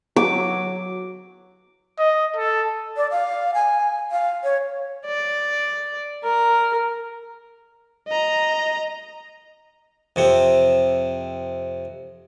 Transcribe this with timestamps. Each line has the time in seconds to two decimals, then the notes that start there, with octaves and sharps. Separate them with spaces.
0.16 F#3 D6
1.99 D#5
2.37 A4
2.97 D5
3.11 F5
3.54 G#5
4.11 F5
4.44 C#5
5.06 D5
6.24 A#4
8.08 D#5 A#5
10.16 F2 C3 C4